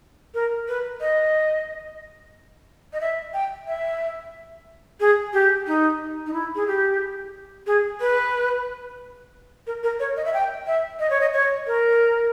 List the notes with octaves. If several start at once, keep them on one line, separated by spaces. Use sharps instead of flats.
A#4
B4
D#5
D#5
E5
G5
E5
G#4
G4
D#4
D#4
E4
G#4
G4
G#4
B4
A#4
A#4
C#5
D#5
E5
G5
E5
D#5
C#5
D#5
C#5
A#4